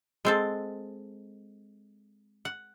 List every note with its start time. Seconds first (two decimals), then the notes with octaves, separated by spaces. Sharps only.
0.25 G#3 C4 A4
2.45 F#5